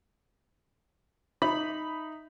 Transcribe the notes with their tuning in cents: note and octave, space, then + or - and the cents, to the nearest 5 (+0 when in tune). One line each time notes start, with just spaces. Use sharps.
D#4 +0 E5 +0 B5 +0